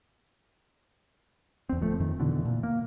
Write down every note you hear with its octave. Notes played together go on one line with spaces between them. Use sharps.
E2 C4
D1 F3 A3
F2 D#3
B2 D3 E3
A#2
A#3